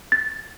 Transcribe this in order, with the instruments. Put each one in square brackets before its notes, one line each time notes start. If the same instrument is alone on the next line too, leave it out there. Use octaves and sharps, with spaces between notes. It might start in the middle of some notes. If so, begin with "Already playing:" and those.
[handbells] A6